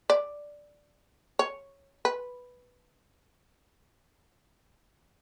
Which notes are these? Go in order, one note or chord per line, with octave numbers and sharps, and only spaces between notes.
D5
C#5
B4